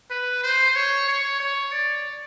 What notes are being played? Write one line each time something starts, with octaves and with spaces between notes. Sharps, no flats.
B4
C5
C#5
C#5
C#5
D5